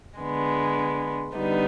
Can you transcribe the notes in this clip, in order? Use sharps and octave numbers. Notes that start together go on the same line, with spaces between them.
D3 G#3 B3
D3 G3 B3 D#4